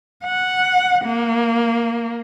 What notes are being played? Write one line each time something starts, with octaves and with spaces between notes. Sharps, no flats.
F#5
A#3